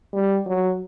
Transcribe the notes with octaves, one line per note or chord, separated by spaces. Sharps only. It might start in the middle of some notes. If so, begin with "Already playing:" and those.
G3
F#3